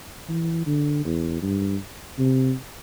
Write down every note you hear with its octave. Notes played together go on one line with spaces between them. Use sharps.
E3
D3
E2
G2
C3